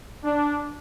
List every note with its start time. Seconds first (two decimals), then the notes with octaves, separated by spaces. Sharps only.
0.25 D4